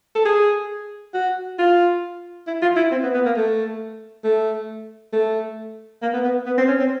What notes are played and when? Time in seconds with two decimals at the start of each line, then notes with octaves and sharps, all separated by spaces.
0.15 A4
0.25 G#4
1.14 F#4
1.58 F4
2.47 E4
2.62 F4
2.76 E4
2.91 C4
3.03 B3
3.14 B3
3.25 A#3
3.36 A3
4.24 A3
5.13 A3
6.02 A#3
6.14 B3
6.24 B3
6.46 B3
6.58 C4
6.68 C#4
6.79 C4